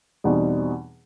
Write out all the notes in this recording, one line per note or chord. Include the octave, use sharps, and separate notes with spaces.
E2 B2 G3 C4 D#4